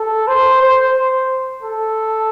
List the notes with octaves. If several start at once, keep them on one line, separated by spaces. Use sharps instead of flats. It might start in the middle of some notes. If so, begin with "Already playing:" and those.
Already playing: A4
C5
C5
A4